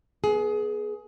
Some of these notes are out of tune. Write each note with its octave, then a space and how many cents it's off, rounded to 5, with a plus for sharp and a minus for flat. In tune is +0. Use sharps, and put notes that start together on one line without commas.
B3 -25 G#4 +20